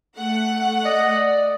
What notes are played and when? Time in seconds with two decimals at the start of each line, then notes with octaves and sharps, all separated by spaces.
0.16 A3 F#5
0.85 D5 D#5